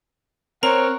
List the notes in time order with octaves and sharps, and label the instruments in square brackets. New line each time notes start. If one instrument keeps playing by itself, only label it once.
[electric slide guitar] C4 [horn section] A#4 C#5 F#5 [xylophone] A#5